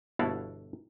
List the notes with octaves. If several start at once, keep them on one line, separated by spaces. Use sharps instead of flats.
G1 B2 E4 F#4 A4 F5